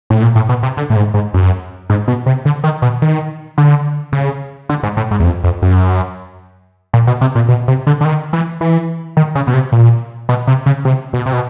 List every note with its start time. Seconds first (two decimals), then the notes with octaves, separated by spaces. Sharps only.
0.10 A2
0.22 A#2
0.35 A2
0.49 B2
0.63 C3
0.77 D3
0.90 A2
0.96 G#2
1.14 G#2
1.34 F#2
1.90 G#2
2.08 B2
2.26 C3
2.45 D3
2.64 D#3
2.82 B2
3.02 D#3
3.58 D3
4.13 C#3
4.69 D3
4.83 G#2
4.97 A2
5.11 G#2
5.20 E2
5.24 F2
5.44 F2
5.62 F#2
6.94 A#2
7.07 B2
7.21 C3
7.35 A#2
7.48 B2
7.68 C3
7.87 D3
8.01 D3
8.05 D#3
8.33 E3
8.61 E3
9.17 D#3
9.35 C#3
9.47 B2
9.54 C3
9.72 A#2
10.29 B2
10.47 C3
10.66 C#3
10.85 C3
11.13 B2
11.26 C3
11.33 B2